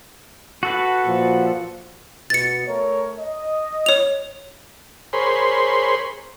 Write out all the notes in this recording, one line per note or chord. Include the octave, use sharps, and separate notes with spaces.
F#4 A4 B4
A#2 F3
B2 A6 C#7
A3 A#4 C#5
D#5
C#5 F7
G#4 A#4 C5 C#5 B5 C6